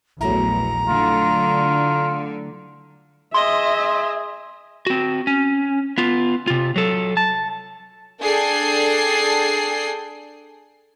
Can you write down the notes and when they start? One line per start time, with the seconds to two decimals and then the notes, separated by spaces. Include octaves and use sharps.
0.21 A#1 E2 F#3 A3 E4 A#5
0.88 D3 F4
3.34 G#4 D#5 E5 C6
4.87 C4 F#4
5.27 C#4
5.98 B3 F4
6.47 C3 F4
6.76 F#3 A4
7.17 A5
8.21 D4 G#4 A4 G5 C7